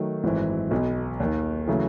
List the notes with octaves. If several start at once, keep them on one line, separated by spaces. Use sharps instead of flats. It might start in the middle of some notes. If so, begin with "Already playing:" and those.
Already playing: D#3 F#3 A3
G#1 F#2 E3
B1 B2
D#2 D#3
C#3 E3 F#3 A3